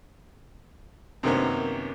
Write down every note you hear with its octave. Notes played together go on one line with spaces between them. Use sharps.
F#2 C3 D#3 A#3 B3 C#4